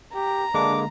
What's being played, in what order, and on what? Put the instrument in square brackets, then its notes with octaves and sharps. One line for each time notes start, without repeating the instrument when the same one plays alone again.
[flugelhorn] G4 [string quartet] A#5
[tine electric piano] D3 G#3 A#3 [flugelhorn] D4 [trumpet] D6